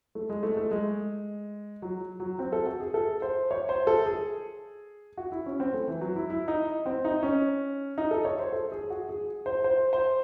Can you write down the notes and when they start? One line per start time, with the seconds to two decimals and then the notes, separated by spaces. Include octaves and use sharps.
0.15 A3
0.29 G#3
0.43 A3
0.57 A3
0.71 G#3
1.82 F#3
2.20 F#3
2.39 C4
2.52 A4
2.66 F#4
2.80 G#4
2.94 A4
3.22 C5
3.51 C#5
3.69 C5
3.87 A4
4.06 G#4
5.17 F#4
5.32 E4
5.46 C#4
5.60 C4
5.74 A3
5.87 E3
6.01 F#3
6.16 E4
6.30 E4
6.48 D#4
6.86 C4
7.05 D#4
7.23 C#4
7.98 D#4
8.11 A4
8.25 C#5
8.40 C5
8.53 A4
8.72 G#4
8.90 F#4
9.09 G#4
9.46 C5
9.64 C5
9.93 C5